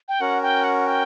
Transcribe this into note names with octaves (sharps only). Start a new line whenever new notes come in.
G5
C#4 F#4 A#4 F#5
G5
F#5
G5